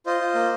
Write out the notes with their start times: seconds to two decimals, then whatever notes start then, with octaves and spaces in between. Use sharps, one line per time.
0.06 F4 C5 D#5
0.20 F4
0.35 A#3